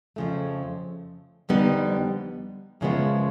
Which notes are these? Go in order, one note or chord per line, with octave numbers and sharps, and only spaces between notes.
F2 C#3 F3 A3
F2 D3 G3 B3 D#4
F#2 C#3 F3 G#3 B3